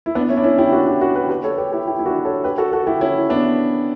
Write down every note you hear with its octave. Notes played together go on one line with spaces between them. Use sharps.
E4
B3 D4
C#4 E4
D4
C#4 E4
E4 G4
D4 F#4
E4 G4
D4 F#4
G4 B4
G4 B4
A4 C#5
G4 B4
E4 G4
E4 G4
E4
D4 F#4
A4 C#5
G4 B4
F#4 A4
F#4 A4
E4 G4
C#4 E4
B3 D4